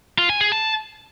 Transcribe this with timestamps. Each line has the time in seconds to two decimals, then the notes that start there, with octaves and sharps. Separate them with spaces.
0.18 F4
0.29 G#5
0.41 G#4
0.52 A5